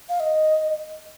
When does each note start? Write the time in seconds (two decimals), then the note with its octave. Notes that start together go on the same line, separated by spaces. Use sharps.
0.09 F5
0.20 D#5